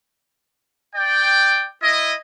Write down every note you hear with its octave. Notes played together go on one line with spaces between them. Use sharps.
D5 G5
E4 D#5